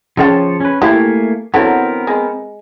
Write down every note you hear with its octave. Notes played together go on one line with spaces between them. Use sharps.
C#3 F3 F4 C#5 G5 A5
C#4 B4
A3 A#3 E4 G4 G#5
D3 E3 F#3 B3 C4 A#4
G#3